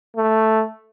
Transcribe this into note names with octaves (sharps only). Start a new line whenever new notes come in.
A3